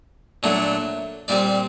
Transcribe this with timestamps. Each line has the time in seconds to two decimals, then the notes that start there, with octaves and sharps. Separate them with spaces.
0.43 A#2 F#3 A3 D4
1.28 A#2 G3 C4 D5